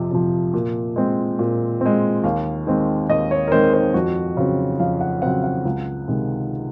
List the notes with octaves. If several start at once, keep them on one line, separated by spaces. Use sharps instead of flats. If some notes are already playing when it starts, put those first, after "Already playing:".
Already playing: F2 C3 F3
C3 F3
A#2
G#3 C4
A#2
G#3 C4
D#2 F5
D#3 G#3 C4
D#2 D#5
C#5
A#4
D#3 G#3 C4 C5
C5
F2 F#4
C#3 F#3 C4
F2 F5
F#5
C#3 F#3 C4 F#5
F#5
C#2
C3 D#3 G#3